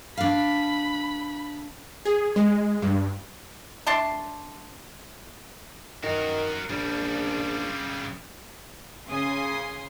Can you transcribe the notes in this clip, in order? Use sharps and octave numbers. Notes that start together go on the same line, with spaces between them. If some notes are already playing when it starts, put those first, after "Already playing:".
D4 F5 B5
G#4
G#3
G2
A3 D4 A5 C6
D#3 F#4 A#4
A#1 C#3 G3
C#3 G#5 C6 D#6